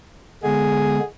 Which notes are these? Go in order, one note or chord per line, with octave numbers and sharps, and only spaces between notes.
D3 G#3 B3 G#4